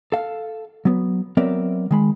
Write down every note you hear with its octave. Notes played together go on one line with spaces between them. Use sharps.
A4 F5
F#3 B3
F#3 B3 C4 A#4 D5 E5
D#3 G#3 B5